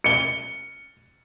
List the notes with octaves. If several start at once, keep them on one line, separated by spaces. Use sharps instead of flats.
C#7 G7